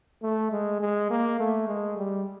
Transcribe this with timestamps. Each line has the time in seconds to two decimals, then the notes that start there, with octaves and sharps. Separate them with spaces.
0.23 A3
0.52 G#3
0.81 G#3
1.11 A#3
1.40 A3
1.68 G#3
1.97 G3